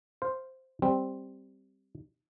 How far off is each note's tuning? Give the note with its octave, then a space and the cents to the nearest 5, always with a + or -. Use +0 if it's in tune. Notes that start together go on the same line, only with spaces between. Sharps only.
C5 +0 F5 +0
G3 +0 C4 +0